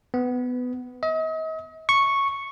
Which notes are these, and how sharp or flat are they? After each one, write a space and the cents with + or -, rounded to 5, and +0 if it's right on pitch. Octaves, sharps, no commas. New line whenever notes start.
B3 +15
D#5 +40
C#6 -5